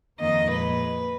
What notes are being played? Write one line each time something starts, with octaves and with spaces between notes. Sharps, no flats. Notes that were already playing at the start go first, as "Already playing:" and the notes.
F2 D#3 A#3 D#5
A#2 G#3 B4